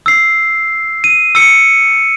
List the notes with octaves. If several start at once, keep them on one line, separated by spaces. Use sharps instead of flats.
E6 C7
D#7
E6 C#7